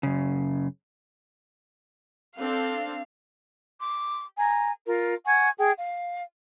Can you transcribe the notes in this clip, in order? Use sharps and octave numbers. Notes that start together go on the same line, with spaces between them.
F#2 C#3
C4 D4 A4 F5
C6 D6
G#5 A#5
F4 A#4
F#5 G#5 C#6 G#6
G#4 G5
F5